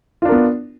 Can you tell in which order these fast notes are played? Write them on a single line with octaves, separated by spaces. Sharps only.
F4 D4 A#4 B3